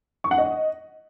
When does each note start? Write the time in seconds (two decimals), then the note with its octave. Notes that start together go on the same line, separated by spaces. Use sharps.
0.24 C#6
0.31 F#5
0.38 D#5